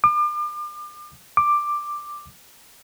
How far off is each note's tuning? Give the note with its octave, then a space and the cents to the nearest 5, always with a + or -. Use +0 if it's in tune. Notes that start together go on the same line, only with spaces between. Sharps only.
D6 +40
D6 +10